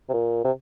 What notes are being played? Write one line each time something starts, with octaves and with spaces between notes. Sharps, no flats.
C3
A#2
C3